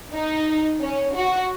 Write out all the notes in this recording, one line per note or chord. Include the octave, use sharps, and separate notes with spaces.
D#4
C#4
F#4